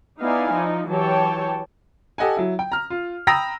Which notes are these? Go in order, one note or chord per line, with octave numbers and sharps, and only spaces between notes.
B3 D#4 E4 D5 F5 G#5
F3 D#4
E3 F#3 G4 C#5 G5 A5
G4 A4 D#5 F#5 G#5
F#3 E4
G5
A#5 F6
F4
G5 A#5 B5 D#6 E6 A#6